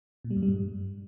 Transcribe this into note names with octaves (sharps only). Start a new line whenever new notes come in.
A#2
G3
F#2
G3
G2